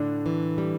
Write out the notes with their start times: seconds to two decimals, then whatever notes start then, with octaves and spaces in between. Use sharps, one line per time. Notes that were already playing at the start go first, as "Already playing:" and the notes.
Already playing: A2 D3 D4
0.26 E3
0.58 G3